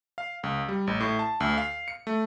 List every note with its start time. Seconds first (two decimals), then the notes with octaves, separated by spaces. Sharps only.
0.18 F5
0.43 C#2
0.69 G3
0.87 A1
1.00 A2
1.19 A5
1.40 D2
1.58 F5
1.88 C#7
2.07 A3